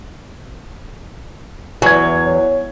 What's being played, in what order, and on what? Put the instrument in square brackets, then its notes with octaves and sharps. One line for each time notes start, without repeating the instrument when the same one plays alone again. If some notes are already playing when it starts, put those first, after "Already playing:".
[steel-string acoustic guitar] E2 [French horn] E3 [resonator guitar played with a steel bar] F#3 [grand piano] G#5 G#6
[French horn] C#5